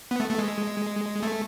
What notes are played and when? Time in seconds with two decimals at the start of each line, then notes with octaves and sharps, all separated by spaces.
0.11 B3
0.20 A3
0.30 A3
0.38 G#3
1.22 A3